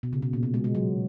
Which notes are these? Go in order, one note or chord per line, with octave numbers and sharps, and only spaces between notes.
B2
C#3
B2
A#2
B2
G#3
G#3
F#3